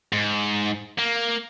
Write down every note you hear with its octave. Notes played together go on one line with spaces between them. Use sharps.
G#2
A#3